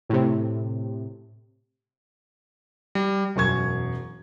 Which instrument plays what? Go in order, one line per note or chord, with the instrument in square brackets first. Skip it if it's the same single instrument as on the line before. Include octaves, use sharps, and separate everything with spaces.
[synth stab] A2 C3
[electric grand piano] G3
[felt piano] E1 F#2 C#6 G#6